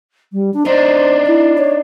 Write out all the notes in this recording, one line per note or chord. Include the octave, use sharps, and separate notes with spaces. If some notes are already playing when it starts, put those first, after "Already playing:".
G3
D4
D4 D#4 C5
E4
C#5